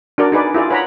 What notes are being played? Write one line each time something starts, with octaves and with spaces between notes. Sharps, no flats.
D4 F#4 A#4 D5
D#4 G#4 B4 D5
E4 F4 G#4 D5
B4 C#5 F#5 A#5 B5